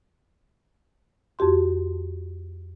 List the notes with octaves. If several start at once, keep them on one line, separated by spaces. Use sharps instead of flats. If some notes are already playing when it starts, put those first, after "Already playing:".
F2 F#4 G4 C6